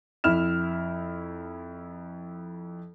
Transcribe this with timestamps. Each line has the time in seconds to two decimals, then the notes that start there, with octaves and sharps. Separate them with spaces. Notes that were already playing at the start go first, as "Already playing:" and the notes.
0.24 F2 E4 E5 F6 E7